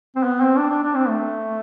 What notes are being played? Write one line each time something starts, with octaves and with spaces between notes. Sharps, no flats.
C4
B3
C4
D4
D4
D4
C4
A3